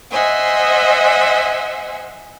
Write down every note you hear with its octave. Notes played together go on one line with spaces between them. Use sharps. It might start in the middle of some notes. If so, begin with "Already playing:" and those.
C5 D#5 E5 F#5 G#5